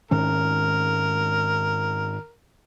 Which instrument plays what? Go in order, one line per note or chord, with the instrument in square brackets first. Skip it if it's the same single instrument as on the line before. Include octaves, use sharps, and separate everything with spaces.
[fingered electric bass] G#2 D#3 C#4 [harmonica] A#4